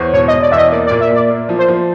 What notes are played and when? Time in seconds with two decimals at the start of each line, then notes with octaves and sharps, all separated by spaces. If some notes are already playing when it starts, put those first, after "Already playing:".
Already playing: E2 C5 C#5
0.13 E1 C#5
0.28 E1 D#5
0.42 D5
0.52 E2 E5
0.58 D#5
0.71 A#3 D5
0.87 A#2 D5
1.01 E5
1.11 A#2 D5
1.30 A#3
1.49 F3
1.59 C5
1.68 F3